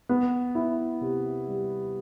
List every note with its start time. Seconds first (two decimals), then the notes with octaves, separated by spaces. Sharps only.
0.09 B3
0.55 E4
1.01 C3
1.48 G3